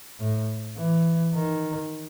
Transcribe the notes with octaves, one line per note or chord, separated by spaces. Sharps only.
A2
E3
D#3